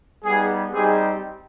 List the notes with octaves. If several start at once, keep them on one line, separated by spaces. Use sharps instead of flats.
G3 B3 D#4 G#4
G3 C4 D#4 G4 G#4